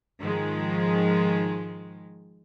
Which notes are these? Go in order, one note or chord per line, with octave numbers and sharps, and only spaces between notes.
G#2 D#3 F3 G#3